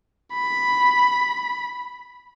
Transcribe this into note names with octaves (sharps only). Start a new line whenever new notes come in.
B5